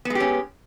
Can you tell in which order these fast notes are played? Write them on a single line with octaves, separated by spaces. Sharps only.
B3 G#3 G4 C#4